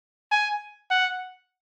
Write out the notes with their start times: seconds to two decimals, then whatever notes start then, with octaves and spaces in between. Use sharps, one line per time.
0.32 G#5
0.90 F#5